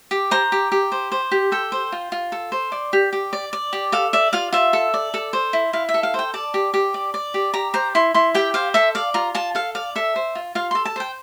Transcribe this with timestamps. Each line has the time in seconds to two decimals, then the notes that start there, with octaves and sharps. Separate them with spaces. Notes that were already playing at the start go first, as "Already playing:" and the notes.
0.11 G4
0.31 C5 A#5
0.52 G4
0.72 G4
0.92 C5
1.12 C5
1.31 G4
1.52 A4 G5
1.72 C5
1.92 F4
2.12 F4
2.32 A4
2.52 C5
2.72 D5
2.93 G4
3.13 G4
3.33 D5
3.53 D5
3.73 G4
3.92 A4 F5
4.13 D5 E5
4.33 F4 F5
4.53 F4 E5
4.73 A4
4.94 D5
5.14 A4
5.33 C5
5.53 E4
5.73 E4 F5
5.89 E5
5.94 A4
6.03 F5
6.14 C5 G5
6.34 D5 A5
6.54 G4
6.74 G4
6.94 D5
7.14 D5
7.34 G4
7.54 G4 A#5
7.74 C5 A#5
7.95 E4 C6
8.14 E4 C6
8.35 G4 G5
8.54 C5 F5
8.74 A4 E5
8.95 D5 F5
9.14 F4 A#5
9.35 F4 A5
9.55 A4 F5
9.75 D5 F5
9.96 A4 E5
10.16 C5
10.35 F4
10.55 F4 F5
10.71 A4 C6
10.85 A5
10.96 C5 G5